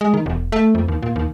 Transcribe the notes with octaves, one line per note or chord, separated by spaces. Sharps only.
G#3
D#3
E1
A3
F2
D#2
A#2
D#2